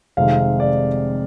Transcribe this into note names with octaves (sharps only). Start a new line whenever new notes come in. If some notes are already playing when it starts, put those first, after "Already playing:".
F1 F2 C3 D#3 G#3 F5
D5